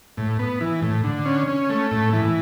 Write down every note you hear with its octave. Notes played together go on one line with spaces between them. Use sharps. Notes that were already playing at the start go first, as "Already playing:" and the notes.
A2
B3
E3
A2
D3
C#4
C#4
A3
A2
E3